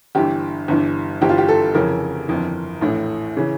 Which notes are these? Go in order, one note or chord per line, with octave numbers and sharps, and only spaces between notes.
G1 G2 E3 G4
G1 G2 E3
G1 G2 E3 G4
F4
G4
A4
F1 F2 C#3 E3 A#4
G1 F2 E3
A#1 A2 E3
C#3 E3